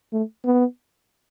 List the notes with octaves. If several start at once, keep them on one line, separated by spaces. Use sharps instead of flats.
A3
B3